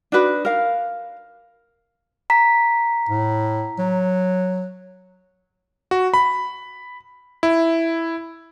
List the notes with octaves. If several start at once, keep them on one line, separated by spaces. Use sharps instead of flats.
D4 D#4 F#4 B4
A#4 F5
A#5 B6
A2
F#3
F#4
B5
E4